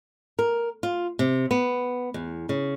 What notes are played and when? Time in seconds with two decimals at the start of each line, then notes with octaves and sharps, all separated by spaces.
0.39 A#4
0.83 F4
1.19 C3
1.51 B3
2.14 E2
2.49 C#3